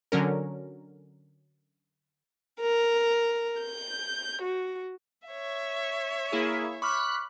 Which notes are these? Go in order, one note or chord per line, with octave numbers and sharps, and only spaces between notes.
D3 F#3 C#4 A#4
A#4
G6
F#4
C#5 E5
A#3 E4 G#4
B5 C#6 D6 F6 F#6